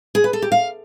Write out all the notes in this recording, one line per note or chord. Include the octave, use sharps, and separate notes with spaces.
G#4
B4
A4
G4
F5